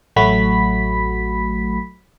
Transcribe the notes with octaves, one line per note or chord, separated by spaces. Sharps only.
A1 F#3 A3 F#4 B5 B6